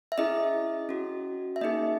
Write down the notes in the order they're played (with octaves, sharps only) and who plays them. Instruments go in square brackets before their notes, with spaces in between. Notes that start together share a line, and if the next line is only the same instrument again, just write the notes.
[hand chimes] E5
C#4 E4 G#4 D#5
C#4 F#4
E5
A#3 D#4 G#4 D#5